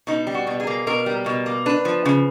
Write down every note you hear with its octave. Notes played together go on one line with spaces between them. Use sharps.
B2 D#4
G3
F#4
B2
G#4
A#3
B2 A#4
G3
B2
A#3
D4 B4
F3
C#3